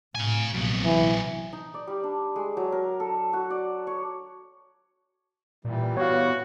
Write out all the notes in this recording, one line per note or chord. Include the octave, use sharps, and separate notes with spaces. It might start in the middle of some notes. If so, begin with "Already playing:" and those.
A2 F5 G#5
A#1 F#2 C3 B3
E3
D#4
D5
G3
D4
G#3
F#3
A#4
A4
F#4
D5
C#5
A#2 E3 G3
B3 F#4 C#5 F5